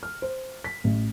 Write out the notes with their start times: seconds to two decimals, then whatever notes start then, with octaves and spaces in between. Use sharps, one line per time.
0.03 F6
0.22 C5
0.64 B6
0.84 A1